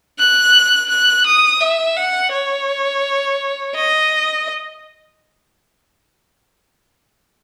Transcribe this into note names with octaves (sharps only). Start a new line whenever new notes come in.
F#6
F#6
D#6
E5
F#5
C#5
D#5